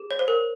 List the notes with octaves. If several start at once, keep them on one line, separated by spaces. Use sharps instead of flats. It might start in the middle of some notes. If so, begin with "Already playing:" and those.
Already playing: G#4
C#5
C5
A#4